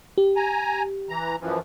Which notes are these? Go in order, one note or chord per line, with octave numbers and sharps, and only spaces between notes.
G4
G#5 A#5
E3 A#5
F#2 E3 F3